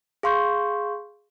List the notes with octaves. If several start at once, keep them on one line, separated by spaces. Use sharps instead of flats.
G#4 F5 C6 C#6 G6